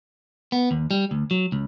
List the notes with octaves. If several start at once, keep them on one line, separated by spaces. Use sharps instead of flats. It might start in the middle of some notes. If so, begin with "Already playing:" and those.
B3
D#2
G3
D2
F#3
C#2